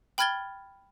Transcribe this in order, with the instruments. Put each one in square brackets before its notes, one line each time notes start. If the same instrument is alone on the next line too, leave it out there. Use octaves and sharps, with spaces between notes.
[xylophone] G5 B5 F6 G#6 A6 G7